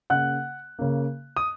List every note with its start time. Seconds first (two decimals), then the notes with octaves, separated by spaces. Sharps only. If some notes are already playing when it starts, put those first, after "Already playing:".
0.10 C#3 A#3 F#5 F#6
0.79 C#3 A#3
1.37 D#6